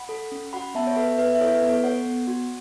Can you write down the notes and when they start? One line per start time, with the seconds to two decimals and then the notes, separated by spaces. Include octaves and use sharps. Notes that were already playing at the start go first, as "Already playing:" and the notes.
Already playing: F#5 B5
0.09 A4
0.32 C#4
0.53 F#4 F#5 B5
0.75 B3 E5 A5
0.87 C#5
0.96 A4 B4 E5
1.18 B3 B4 E5
1.35 E5
1.40 E4 A4 C#5
1.55 B4
1.63 B3
1.69 A4 C#5
1.84 A4 C#5 F#5
2.06 B3
2.27 F#4